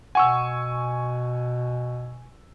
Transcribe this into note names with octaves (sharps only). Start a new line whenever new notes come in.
B2 F#5 G#5 C#6 E6